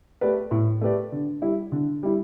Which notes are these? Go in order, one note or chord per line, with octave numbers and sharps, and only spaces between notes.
A3 G4 B4 D5
A2
A3 G4 B4 D5
D3
G3 E4
D3
G3 E4